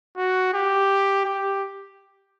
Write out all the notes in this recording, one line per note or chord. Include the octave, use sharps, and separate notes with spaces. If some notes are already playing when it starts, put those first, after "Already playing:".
F#4
G4
G4